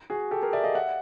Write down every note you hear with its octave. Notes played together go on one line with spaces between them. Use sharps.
F#4 G#4
G4 A4
G#4 A#4
D5 E5
D#5 F5
E5 F#5